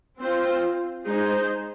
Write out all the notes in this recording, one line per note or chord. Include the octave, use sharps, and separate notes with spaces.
C4 F4 C5
G#3 D#4 G#4 C5